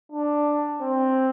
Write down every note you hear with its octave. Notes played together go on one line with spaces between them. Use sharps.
D4
C4